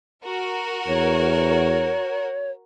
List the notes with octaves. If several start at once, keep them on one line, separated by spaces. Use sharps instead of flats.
F#4 A#4
E2 C#5